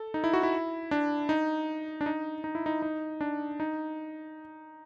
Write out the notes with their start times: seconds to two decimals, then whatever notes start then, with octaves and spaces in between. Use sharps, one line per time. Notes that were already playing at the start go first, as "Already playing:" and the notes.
Already playing: A4
0.14 D#4
0.24 E4
0.33 F#4
0.43 E4
0.91 D4
1.29 D#4
2.01 D4
2.06 D#4
2.44 D#4
2.55 E4
2.66 D#4
2.82 D#4
3.21 D4
3.60 D#4